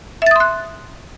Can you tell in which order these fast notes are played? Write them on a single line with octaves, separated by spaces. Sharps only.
E5 A6 D#6 C6 F#6